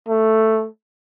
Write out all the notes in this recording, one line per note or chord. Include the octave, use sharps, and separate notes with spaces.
A3